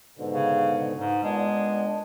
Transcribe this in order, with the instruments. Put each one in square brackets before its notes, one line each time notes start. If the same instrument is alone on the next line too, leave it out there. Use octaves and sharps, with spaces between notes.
[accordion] G#2 B2 D3
[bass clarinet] C#3
G#2
[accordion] A#2 B3 D4 [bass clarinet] G#3